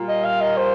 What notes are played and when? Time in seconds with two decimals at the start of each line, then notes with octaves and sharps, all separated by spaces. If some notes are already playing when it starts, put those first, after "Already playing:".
Already playing: A#2 G3 A#3 F4 A#4
0.08 D#5
0.24 F5
0.41 D#5
0.57 C5